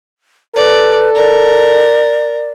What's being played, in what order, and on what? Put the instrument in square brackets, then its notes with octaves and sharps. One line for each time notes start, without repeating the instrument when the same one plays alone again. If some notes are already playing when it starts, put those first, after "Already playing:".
[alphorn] A4 [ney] B4 [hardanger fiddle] D5
[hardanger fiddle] A#4 [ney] D5